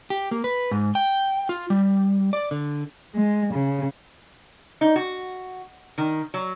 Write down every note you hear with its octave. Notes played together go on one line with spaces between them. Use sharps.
G4
A#3
B4
G#2
G5
F4
G3
D5
D3
G#3
C#3
D#4
F#4
D#3
F#3